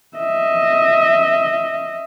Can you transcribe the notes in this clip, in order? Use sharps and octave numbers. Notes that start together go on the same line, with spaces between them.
D#5 E5